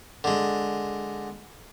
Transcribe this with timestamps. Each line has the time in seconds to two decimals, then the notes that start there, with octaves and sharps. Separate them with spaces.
0.24 D3 G#3